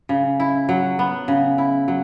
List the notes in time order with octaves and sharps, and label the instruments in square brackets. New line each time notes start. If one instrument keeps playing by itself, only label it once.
[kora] C#3
E4
F#3
B3
C#3
E4
F#3